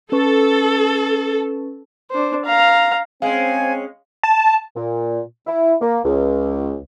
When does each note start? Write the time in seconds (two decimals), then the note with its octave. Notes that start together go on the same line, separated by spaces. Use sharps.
0.12 C#4 A4 B4 C#6
2.11 D4 C5
2.45 F5 A#5
3.22 G#3 C4 C#4 C5 F5 G#5
4.23 A5
4.76 A#2
5.47 E4
5.81 A#3
6.05 C#2